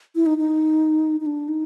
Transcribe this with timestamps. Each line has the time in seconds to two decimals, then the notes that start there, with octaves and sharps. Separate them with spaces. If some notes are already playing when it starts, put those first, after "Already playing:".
0.15 E4
0.26 D#4
0.38 D#4
1.20 D#4
1.26 D4
1.49 D#4